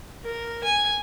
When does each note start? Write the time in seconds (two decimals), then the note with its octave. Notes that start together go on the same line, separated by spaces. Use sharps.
0.24 A#4
0.64 G#5